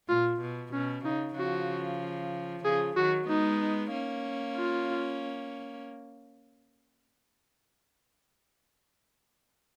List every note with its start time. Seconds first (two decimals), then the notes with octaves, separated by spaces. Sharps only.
0.09 A#2 F4
0.41 B2
0.73 B2 C#4
1.05 C#3 D#4
1.36 C#3 F3 F#4
2.64 C#3 F3 G#4
2.97 D#3 F#3 F#4
3.28 G#3 B3 D#4
3.92 A#3 C#4
4.56 F4